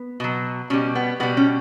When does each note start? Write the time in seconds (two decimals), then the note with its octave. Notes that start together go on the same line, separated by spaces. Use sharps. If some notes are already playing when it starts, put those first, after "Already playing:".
Already playing: B3
0.20 B2 F#3
0.70 B2 G3 C#4
0.95 B3
1.20 B2 G3 B3
1.37 C#4